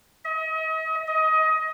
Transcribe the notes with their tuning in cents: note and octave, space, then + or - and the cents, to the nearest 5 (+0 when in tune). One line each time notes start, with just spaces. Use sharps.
D#5 +40
D#5 +20